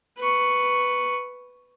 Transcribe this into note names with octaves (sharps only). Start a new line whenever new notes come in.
B4 C#6